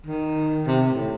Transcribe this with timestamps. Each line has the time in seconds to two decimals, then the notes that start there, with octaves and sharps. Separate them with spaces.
0.06 D#3
0.67 C3
0.91 A2